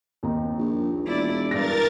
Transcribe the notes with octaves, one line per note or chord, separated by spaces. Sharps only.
D#2 C4 D#4
A#1
E1 E4 D5
G2 A#4 A6 A#6